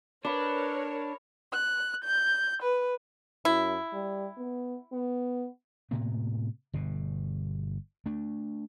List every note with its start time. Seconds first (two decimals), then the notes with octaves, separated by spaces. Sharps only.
0.25 D4 A#4 B4 C#5 D5 B5
1.52 F#6
2.04 G6
2.62 B4
3.45 F#2 E4
3.93 G3
4.38 B3
4.93 B3
5.91 A2 C3 A#3 B3
6.73 G1 B2
8.06 A3 D4